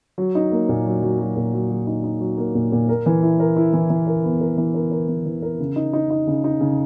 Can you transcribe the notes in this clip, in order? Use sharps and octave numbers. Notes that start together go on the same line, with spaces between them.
F#3
D#4
A#3
A#2
F#3
F#3
F#3
A#2
F#3
F#3
D#4
D#4
F#3
A#3
A#2
A#2
A#4
E3
E4
A#4
E4
E3
E3
A#4
B3
A#4
E3
A#4
A#4
E3
E3
A#4
C#3
D#4
D#4
D#4
C#3
D#4
C#3